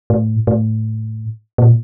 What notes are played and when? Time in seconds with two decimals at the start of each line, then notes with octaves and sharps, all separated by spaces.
0.10 A2
0.47 A2
1.58 A#2